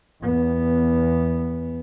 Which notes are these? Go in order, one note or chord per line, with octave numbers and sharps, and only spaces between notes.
E2 B3